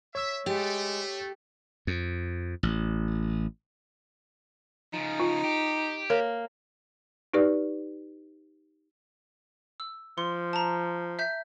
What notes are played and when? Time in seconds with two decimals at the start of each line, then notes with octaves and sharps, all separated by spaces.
0.15 C#5 E5 E6
0.46 G#3 A3 G4
1.87 F2
2.63 A1
4.93 C#3 F3 D#4
5.20 F4
5.44 G4
6.10 A#3 A#4 C#5
7.34 D#4 G4 B4 D5
9.80 E6
10.18 F3 C6
10.53 A5 A#5
11.19 E5 G6 B6